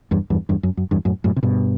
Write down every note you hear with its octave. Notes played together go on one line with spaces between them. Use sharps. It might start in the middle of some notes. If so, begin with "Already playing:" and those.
E2 G2
E2 G2
E2 G2
F#2
F#2
E2 G2
F#2 A2
F#2 A2
C3
G2 B2